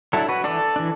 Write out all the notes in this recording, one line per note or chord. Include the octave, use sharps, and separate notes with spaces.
F#3 D4 E4 A4
F#4 B4
E3 D4 A4 D5
E3 D4